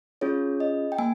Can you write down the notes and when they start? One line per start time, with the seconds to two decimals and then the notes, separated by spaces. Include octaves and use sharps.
0.21 C#4 F4 G#4 C#5
0.60 D#5
0.92 G5
0.99 A#3 G#5